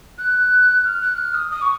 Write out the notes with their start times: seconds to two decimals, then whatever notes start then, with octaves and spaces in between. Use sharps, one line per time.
0.18 F#6
0.84 F6
1.01 F#6
1.17 F6
1.34 D#6
1.50 D#6
1.61 C#6